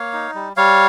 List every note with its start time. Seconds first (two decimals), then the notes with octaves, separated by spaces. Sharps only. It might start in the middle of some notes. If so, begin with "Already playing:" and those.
Already playing: A#3 C#5 F5
0.13 D#4
0.35 G3
0.57 G3 C#5 F5